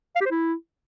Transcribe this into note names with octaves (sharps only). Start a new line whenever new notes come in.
F5
G4
C5
E4